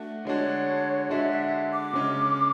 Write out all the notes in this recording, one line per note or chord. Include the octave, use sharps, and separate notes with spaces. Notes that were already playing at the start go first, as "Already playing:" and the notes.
Already playing: A3 D4 F#4
D3 G#3 D4 F#4 C#5
D3 G#3 D4 F#4 E5
E5
D6
C#3 G#3 C#4